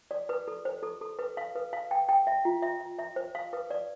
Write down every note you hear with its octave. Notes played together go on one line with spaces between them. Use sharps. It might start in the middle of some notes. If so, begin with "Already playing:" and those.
D5
B4
A4
C5
A4
A4
B4
F5
B4
F5
G5
G5
E5
F4
E5
E5
E5
C5
F5
B4
D5